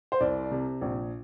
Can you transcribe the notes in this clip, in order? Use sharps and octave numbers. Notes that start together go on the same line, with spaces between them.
C5
C2 D5
C3
A#1